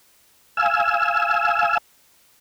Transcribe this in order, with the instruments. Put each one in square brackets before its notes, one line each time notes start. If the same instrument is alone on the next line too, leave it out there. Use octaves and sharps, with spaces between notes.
[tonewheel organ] F5 G#5 E6